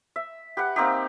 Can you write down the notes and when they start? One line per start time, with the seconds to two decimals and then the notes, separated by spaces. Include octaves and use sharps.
0.16 E5
0.57 G4 B4 F#5
0.76 A#3 C4 D#4 G4